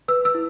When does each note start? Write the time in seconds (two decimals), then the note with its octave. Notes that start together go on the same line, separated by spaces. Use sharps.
0.08 B4 E6
0.25 E6
0.34 E4